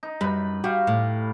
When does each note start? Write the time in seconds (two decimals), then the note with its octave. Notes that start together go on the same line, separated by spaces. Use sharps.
0.03 D#4
0.21 F#2 G3 B4 B5
0.64 F#4 G4 F5
0.87 A2